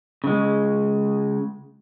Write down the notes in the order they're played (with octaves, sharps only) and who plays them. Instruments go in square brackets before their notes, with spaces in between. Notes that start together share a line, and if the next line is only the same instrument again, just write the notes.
[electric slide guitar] C#3 G#3